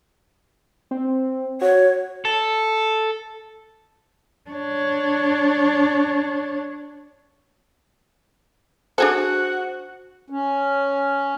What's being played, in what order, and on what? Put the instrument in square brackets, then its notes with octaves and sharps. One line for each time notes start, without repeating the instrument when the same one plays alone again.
[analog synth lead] C4
[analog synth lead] F#4 [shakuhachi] C#5
[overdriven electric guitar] A4
[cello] D4 C#5
[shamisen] D4 G#4 A4 [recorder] F#4 [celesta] C5 [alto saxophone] F#5
[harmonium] C#4